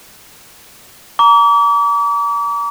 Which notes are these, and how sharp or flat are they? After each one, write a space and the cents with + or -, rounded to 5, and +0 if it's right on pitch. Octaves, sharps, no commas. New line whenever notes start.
A#5 +0 D6 -40